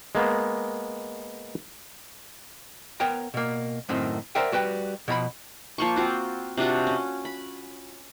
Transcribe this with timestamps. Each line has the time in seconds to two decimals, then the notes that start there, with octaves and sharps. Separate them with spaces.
0.15 G#3 A#3 B3
3.00 B3 A#4 C#5 G5 A#5
3.34 B2 A#3
3.89 F#2 A2 D#3 C4
4.35 A#4 C5 D5 E5 F#5 G5
4.52 G3 F#4 B4 G5
5.08 B2 F3 A#5 B5
5.78 F3 A#3 C#6
5.96 C4 F4 F#4
6.57 C3 D4 F4 F#4
6.87 C#4
7.25 B5